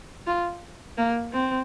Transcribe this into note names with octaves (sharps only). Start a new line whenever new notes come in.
F4
A#3
C4